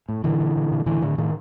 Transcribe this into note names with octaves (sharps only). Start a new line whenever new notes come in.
A2
A#2 D3 E3
A#2
A#2
A#2
A2 D3 E3
A2 D3
A2 D#3